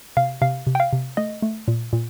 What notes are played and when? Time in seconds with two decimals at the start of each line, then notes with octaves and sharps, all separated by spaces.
0.17 C3 F5
0.42 C3 F5
0.67 C3
0.75 G5
0.80 F5
0.93 C3
1.17 A3 D#5
1.42 A3
1.68 A#2
1.93 A#2